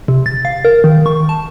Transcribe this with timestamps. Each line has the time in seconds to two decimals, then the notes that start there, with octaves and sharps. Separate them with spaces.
0.08 C3
0.26 A6
0.45 F5
0.65 A#4
0.84 D#3
1.06 C#6
1.29 A5